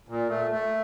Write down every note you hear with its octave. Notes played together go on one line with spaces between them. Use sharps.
A#2
A3
A3